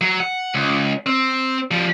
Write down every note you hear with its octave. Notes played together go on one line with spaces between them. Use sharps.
F#3
F#5
C#2
C4
F3 G3